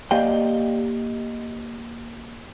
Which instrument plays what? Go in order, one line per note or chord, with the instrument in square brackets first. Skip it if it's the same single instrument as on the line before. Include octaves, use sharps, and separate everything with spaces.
[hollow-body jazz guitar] A#3 G4 D5 D#5 F5 G5